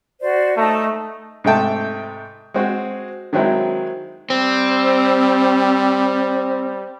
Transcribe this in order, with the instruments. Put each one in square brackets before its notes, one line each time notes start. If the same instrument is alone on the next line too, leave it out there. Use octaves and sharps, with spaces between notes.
[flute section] F#4 C5 D5
[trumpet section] A3 [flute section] D#4 A5 A#5
[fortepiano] G#2 C3 A3 G5 A5
G#3 C4 F#4
D#3 F#3 G#3 C4 E4
[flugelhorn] G3 [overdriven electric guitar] C4